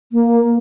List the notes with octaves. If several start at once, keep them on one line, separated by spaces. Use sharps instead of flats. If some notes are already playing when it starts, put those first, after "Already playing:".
A#3